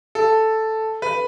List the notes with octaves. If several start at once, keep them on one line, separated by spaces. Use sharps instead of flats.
A4
B4